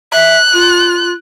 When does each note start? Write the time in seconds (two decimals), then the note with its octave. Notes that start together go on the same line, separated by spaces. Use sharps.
0.13 E5 F#6
0.53 F4